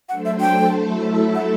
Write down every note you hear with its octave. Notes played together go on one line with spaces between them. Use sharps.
F#3 A3 D4 A4 C5 F#5
E5
G5
F#3 A3 E4 A4 E5
F#5